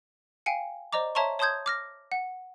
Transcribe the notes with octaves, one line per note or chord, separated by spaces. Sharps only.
F5 G5 G#5 C#7
C5 D5 D#5 A#5 D6
C#5 E5 A5 A#5 C6 C#6
C#5 A5 C6 D#6 G6 G#6
D6 F6 A#6
F#5